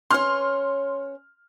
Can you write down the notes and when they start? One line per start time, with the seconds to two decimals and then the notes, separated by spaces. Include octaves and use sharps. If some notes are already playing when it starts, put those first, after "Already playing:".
0.10 C#4 B4 C#5 C6 F6